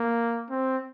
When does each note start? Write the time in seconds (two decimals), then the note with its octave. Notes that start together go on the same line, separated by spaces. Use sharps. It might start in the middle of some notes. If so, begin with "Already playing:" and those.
Already playing: A#3
0.50 C4